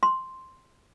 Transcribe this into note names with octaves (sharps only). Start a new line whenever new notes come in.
C6